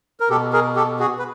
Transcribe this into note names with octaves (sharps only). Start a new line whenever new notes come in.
A#4
B2 G4 A4
G#4 A#4
G4 A4
F#4 G#4
B4